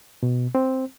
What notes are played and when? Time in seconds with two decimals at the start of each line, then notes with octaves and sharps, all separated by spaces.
0.23 B2
0.55 C4